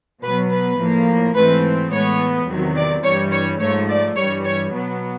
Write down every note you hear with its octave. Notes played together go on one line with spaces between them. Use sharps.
B2 F#3 B3 B4
B4
A2 F3 A#3
G#2 E3 A3 C4 B4
A2 E3 G#3 B3 C#5
E2 C3 D#3 F#3
D5
G2 E3 G3 C#5
C#5
G#2 F3 A3 C#5
D5
G2 E3 G3 C#5
C#5
B2 F#3 B3